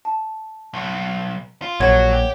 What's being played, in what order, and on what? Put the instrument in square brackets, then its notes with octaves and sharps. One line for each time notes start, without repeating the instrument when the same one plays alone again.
[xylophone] A5
[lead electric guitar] B1
F4
[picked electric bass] A#1 [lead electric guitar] F#3 [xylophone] C#5 F#5 G#6
[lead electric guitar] G4